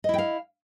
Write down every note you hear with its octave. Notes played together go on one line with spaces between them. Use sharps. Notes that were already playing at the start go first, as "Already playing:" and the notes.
E4 D#5 F5 G5